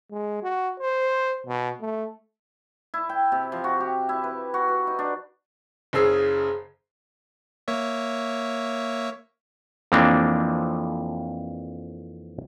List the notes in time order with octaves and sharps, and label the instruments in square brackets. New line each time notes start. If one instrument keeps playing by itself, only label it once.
[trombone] G#3
F#4
C5
B2
A3
[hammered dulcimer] E4
G5
C3
F3
F#4
G4
E4
B4
F#4
B4
D#4
D4
[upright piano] F#1 C#3 G#4 E6 C7
[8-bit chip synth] A#3 C#5 E5
[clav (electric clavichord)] F2 E3 F3 A#3 C4 D4